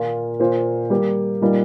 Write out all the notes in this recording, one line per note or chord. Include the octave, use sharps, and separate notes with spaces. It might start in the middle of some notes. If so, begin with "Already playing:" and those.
Already playing: A#2 A#3 F4
A#2 A#3 F4 C5
G3 A#3 G4
A#2 G3 A#3 D#4